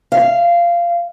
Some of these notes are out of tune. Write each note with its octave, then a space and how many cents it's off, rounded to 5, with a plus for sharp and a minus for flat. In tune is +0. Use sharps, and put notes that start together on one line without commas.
F5 -15